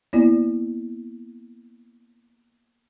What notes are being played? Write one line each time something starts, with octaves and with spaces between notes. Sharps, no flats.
A#3 B3 E4 D5